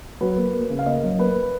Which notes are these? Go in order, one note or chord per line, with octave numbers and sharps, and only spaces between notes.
F#3 B4
A#3
A#3
C#3
F5
A#3 D#5
F#2
A#3 B4